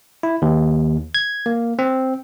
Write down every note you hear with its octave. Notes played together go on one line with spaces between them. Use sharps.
E4
D#2
G#6
A#3
C4